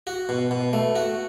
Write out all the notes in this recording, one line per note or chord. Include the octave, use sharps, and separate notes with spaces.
F#4
B2
B2
A3
F#4